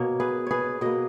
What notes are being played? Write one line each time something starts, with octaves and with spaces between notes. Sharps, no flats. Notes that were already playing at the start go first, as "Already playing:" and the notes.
Already playing: B2 A#3 C#5
G#4 B4
G#4 B4 C#5
B2 A#3 B4 D#5